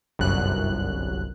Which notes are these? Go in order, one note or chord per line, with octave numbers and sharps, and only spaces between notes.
G1 C2 F#2 F#6